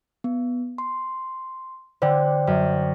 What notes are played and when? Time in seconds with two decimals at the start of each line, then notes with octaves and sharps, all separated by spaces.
0.24 B3
0.78 C6
2.02 D3 C5 D5 G5 F#6
2.47 F#2